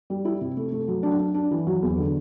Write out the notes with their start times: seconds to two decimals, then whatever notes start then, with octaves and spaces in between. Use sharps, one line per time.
0.10 G3
0.25 E4
0.41 C3
0.57 A3
0.72 A3
0.88 F#3
1.03 D4
1.19 D4
1.34 D4
1.51 E3
1.67 F#3
1.82 E2
1.97 D3